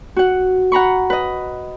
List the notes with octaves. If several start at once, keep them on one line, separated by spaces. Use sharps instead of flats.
F#4 F#5
F#5 A#5 B5 C#6
B4 D#5